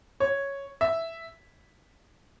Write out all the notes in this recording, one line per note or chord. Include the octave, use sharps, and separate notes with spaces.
C#5
E5